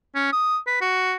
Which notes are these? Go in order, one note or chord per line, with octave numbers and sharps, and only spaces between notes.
C#4
D#6
B4
F#4